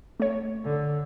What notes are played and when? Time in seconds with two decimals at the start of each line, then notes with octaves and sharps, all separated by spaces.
0.20 A3 C#5
0.64 D3